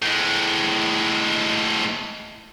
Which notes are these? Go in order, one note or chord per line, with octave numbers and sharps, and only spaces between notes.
A2 G#3